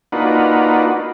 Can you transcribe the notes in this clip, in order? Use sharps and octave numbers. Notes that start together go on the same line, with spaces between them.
A#3 D4 D#4 F4 F#4 B4